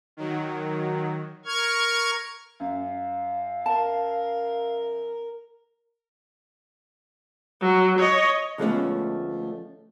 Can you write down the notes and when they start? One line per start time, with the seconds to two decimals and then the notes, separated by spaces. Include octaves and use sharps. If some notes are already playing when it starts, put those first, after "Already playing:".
0.17 D#3 F#3
1.46 A#4 C#6 F6 G#6
2.60 F#2 F5
3.66 A#4 A5
7.61 F#3
7.99 C#5 D#5
8.58 D2 F3 G#3 A3 B3 C#4